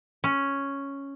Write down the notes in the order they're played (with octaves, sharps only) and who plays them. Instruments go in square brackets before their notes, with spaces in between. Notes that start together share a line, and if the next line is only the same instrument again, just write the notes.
[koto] C#4